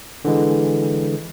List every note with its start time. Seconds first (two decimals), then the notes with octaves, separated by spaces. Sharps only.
0.25 D3 E3 G#3